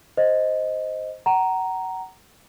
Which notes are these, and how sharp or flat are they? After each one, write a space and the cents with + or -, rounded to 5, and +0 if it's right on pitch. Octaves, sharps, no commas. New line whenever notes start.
C5 +0 D#5 +0
F#5 +30 A#5 +0